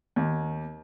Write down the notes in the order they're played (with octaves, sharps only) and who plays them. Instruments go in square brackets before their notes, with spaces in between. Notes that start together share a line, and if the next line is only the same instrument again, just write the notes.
[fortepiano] D#2